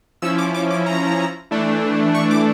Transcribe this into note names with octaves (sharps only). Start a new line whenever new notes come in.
F3 C#4 E4 E6
D6
D6
D6
A#5
E3 A3 D4
C#6
D6